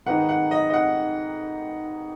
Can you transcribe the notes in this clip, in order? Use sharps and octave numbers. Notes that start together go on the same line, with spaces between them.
G#2 D#3 B3 D#4 F#5
F#5
D#5
D#5
F#5